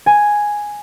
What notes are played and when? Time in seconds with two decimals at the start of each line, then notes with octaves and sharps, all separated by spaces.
0.06 G#5